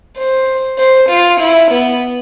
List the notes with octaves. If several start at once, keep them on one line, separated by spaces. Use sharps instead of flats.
C5
C5
F4
E4
B3